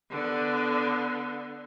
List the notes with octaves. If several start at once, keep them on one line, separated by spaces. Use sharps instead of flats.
D3 B3